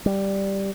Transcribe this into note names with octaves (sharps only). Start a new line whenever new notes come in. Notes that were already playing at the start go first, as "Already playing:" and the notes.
G3